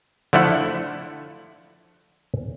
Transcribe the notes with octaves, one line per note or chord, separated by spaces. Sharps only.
D3 F3 A3 E4 F#5